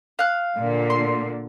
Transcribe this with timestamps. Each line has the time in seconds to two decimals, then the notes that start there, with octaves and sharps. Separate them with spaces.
0.19 F5 F#6
0.57 A#2 D3
0.90 C6